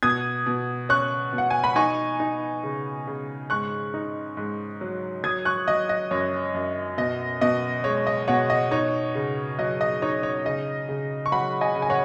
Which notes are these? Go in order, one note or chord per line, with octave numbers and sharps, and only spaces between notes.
B2 D#6 G#6
B2
C#4 C#6 F#6
B2
F#5
G#5
B5
D#4 G#5 C#6
D#4
C#3
C#3
G#2 C#6 F#6
D#4
G#2
F#3
F#3 D#6 G#6
C#6 F#6
F#3 D#5
D#5
F#2 C#5
F#2
B2 D#5
B2 D#5
G#3 C#5
D#5
B2 C#5 F#5
D#5
D#4 C#5
C#3
F#3 D#5
D#5
D#4 C#5
C#5
C#3 D#5
C#3
C#6
F#3 F#5 B5
D#5 G#5
C#3
G#5
C#5 F#5